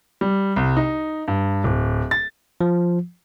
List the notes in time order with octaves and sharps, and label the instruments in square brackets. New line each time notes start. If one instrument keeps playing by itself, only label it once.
[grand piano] G3
C2
D#4
G2
D1
A6
[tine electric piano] F3